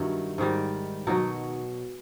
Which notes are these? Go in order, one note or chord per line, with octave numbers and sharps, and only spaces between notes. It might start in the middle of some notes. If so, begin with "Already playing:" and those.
Already playing: G2 D#3 F#3 E4
G#2 D#3 G3
B2 F#3 D#4